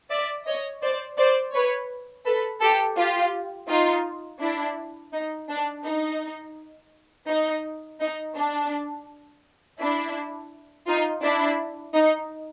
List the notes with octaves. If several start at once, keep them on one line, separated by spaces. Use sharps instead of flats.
D5 E5
C#5 D#5
C5 D5
C5 D5
B4 C#5
A4 B4
G4 A4
F4 G4
D#4 F4
D4 E4
D#4
D4
D#4
D#4
D#4
D4
D4 E4
D#4 F4
D4 E4
D#4